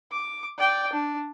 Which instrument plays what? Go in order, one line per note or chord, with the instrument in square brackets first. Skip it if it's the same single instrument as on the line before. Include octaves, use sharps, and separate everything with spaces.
[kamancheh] D6
D5 G5
D4